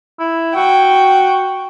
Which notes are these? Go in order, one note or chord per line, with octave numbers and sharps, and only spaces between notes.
E4
F#4 G5